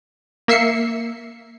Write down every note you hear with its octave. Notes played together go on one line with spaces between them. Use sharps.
A#3 E5 C7 C#7